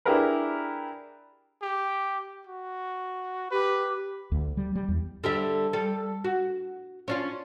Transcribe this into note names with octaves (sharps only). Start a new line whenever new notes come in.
D4 E4 G4 G#4 A#4 B4
G4
F#4
G4 B4
D2
G3
G3
E2
D3 G3 E5
G3 A4
F#4
C#4 D4 F4